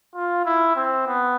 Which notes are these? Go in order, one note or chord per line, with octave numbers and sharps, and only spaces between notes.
F4
E4
C4
B3